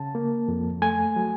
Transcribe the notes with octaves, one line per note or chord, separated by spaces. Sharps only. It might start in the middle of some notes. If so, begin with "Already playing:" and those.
Already playing: C#3 A5
A#3
F2
A3 G#5
F#3